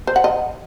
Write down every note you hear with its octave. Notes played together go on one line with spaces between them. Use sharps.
C5
F#5
D#5